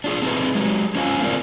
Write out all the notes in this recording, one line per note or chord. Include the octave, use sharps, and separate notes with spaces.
D4 F4 G#4
C4 D#4 E4 G#4 B4
F#3 G#3
C#4 F4 C5 C#5 F5 G#5
C4 F4 G#4 A#4 C5 D5